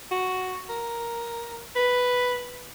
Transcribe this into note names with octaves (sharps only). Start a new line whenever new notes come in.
F#4
A#4
B4